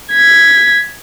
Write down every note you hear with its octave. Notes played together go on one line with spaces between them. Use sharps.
G#6 B6